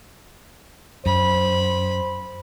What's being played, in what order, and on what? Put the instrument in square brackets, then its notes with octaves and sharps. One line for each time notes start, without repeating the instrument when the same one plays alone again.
[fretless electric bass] F#2 [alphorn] C5 [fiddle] B5